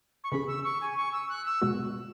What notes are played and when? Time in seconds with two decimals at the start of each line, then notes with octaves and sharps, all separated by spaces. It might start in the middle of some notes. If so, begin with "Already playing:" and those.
0.23 C#6
0.31 C#3 E3 C#4 G#4 B5
0.48 E6
0.64 C#6
0.81 G#5
0.96 C#6
1.12 E6
1.29 F#6
1.45 E6
1.62 B2 G#3 B3 F#4